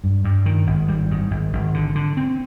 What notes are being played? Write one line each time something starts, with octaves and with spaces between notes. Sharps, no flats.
G2
G2
D#3
G#1
G3
G#2
G#1
G#1
D3
D3
C4